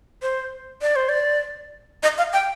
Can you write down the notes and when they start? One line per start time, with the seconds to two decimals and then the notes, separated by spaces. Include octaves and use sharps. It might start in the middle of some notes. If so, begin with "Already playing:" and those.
0.22 C5
0.82 D5
0.96 C5
1.09 D5
2.03 D#5
2.18 F5
2.33 G5